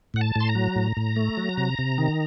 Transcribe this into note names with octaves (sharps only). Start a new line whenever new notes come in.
A2 F#5
A5
A2 C6
A#5
F#3
A2
A2
A3
F#3
C3
C3
D#3